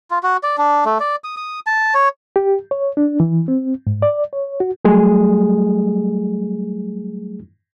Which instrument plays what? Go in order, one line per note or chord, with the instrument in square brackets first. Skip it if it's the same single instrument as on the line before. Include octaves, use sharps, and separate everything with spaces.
[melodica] F4
F#4
D5
D4
A3
D5
D#6
D#6
A5
C#5
[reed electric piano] G4
C#5
D4
E3
C4
G#2
D5
C#5
F#4
F#3 G3 A3 G#4